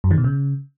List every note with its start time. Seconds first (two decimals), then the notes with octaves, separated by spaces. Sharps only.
0.04 F#2
0.11 D#3
0.18 B2
0.24 C#3